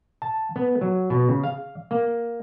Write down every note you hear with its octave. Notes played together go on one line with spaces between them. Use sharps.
A5
B3
F#3
B2
C#3
F5
A#3